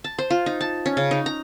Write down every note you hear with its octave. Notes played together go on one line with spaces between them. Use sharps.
A5
C5
F4
D#4
A5
C#4
C#3
D#4
A#5